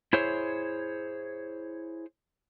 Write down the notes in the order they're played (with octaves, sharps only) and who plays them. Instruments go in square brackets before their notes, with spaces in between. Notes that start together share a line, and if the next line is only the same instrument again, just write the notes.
[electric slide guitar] E4 G#4 C5 C#5